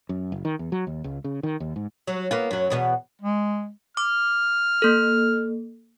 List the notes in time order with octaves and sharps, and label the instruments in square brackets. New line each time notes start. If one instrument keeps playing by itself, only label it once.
[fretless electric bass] F#2
F#1
D#3
E2
F#3
D#2
C#2
C#3
D#3
D#2
G#2
[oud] F#3
A#3 B3 F4
F#2 F#3
E2 B2 B3
[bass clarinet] G#3
[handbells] D6 [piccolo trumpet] F6
[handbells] A#3 A4